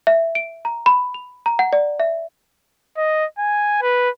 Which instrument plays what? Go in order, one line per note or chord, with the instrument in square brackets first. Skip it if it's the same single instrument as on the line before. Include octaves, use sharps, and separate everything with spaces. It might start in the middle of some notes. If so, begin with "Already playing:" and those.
[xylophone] E5
D7
A#5
B5
F7
A#5
F#5
D5
E5
[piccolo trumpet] D#5
G#5
B4